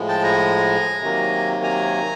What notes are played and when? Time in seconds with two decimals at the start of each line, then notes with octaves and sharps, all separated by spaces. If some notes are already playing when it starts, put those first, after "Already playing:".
Already playing: A2 F3 G#3
0.09 G5 A5
0.24 G#5 A#5
1.01 C3 D#3 F#3 A#3
1.63 G#5 A#5